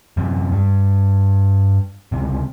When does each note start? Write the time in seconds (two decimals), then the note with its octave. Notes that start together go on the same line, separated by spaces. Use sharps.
0.17 F#2 C3
0.52 G2
2.12 C#2 C3